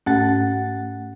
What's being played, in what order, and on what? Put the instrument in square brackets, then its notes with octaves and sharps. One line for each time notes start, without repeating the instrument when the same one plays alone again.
[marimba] G#2 C#4 [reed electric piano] A3 F#5 A6